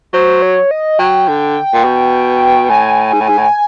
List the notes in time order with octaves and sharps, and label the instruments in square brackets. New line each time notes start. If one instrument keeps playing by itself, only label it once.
[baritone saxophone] F#3 [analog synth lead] C5
[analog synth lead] C#5
D#5
[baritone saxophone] F#3 [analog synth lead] G5
[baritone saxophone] D3
A#2
B2
[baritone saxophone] A2 [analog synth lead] G#5
[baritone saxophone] G#2
A2
G#2
A2